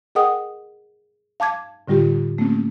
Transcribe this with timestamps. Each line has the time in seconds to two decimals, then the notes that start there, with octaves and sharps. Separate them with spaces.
0.15 G#4 A#4 D#5 F#5 G5 D#6
1.40 F5 A5 D6 G#6
1.88 A2 D3 G3 F4 G4
2.38 A3 A#3 C4 C#4